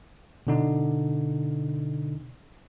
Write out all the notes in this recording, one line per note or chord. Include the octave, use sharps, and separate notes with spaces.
B2 D3 D#4